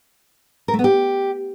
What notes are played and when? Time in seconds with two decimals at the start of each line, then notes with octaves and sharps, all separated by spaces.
0.68 A#4
0.74 A3
0.79 B3
0.84 G4